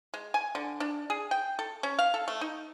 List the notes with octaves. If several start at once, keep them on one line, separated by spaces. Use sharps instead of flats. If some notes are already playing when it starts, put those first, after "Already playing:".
G#3
G#5
D3
D4
G#4
G5
A4
C#4
F5
A4
A3
D#4